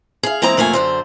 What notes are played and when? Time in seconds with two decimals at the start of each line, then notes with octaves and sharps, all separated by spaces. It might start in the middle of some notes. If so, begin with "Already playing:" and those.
0.23 G#4 F5
0.42 E3 G#3 A#3 C4 A#5
0.57 F2 C3 A3 A#3 F5 G#5
0.73 F#2 D3 C5